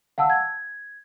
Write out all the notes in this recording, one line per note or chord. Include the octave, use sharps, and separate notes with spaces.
F5 F#5 A5 E6
G#6